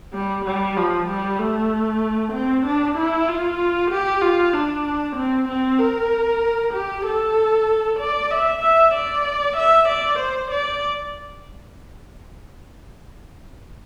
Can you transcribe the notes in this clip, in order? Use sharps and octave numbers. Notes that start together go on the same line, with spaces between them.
G3
G3
F3
G3
A3
C4
D4
E4
F4
G4
F4
D4
C4
C4
A#4
G4
A4
D5
E5
E5
D5
E5
D5
C5
D5